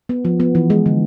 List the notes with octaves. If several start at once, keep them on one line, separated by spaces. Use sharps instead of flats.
B3
F3
B3
E3
G#3
D3